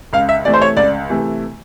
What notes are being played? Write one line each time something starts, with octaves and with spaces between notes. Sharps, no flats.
C#2 F5
E5
C3 E3 A3 D5
C5
C#5
C#2 D5
C3 E3 A3